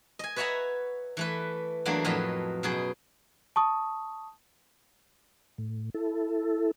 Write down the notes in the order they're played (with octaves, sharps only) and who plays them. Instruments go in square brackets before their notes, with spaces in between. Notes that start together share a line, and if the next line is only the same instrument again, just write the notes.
[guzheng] D#5 G#5
B4 C#5 E5 F#5 G#5 A#5
E3 A3 B4
E2 F#3 A3 A#3 D4
F2 A2 F#3 B4 D#5
F#2 B2 G#4
[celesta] A5 C#6 D#6
[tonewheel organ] A2
E4 A4